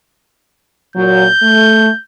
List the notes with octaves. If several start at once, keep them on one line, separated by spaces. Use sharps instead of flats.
A#2 F#3 G6
A3